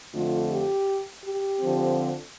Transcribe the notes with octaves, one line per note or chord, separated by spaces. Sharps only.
F2 D3 A3 F4
G4
G4
D3 F3 C4